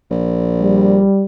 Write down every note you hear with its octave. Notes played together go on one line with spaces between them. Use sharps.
A#1
G3